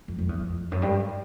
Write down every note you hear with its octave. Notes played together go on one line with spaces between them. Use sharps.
F2
F2
E2
F2
F#2
G2